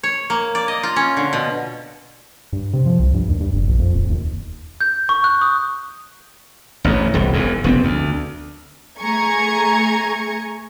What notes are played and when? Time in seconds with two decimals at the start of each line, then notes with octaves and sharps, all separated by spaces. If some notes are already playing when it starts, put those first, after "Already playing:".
0.03 C#5
0.30 A#3
0.55 D5
0.68 D#5
0.83 F4
0.96 C#4
1.17 D3
1.33 B2
2.53 G2
2.73 C3
2.86 F3
2.99 C2
3.14 G2
3.28 D#2
3.40 G2
3.53 F1
3.67 A#1
3.79 F2
3.95 D#1
4.10 D#2
4.81 G6
5.09 C#6
5.24 F#6
5.41 D#6
6.84 A1 E2 G#2
7.14 E1 C2
7.33 E1 E2 G#2
7.64 F1 B3 C4
7.83 D2
9.01 A3 G#4 G#5 A#5 C#6 G#6